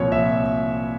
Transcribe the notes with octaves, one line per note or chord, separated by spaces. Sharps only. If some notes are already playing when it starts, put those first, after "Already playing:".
Already playing: C2 A#2 F3 C#5
E5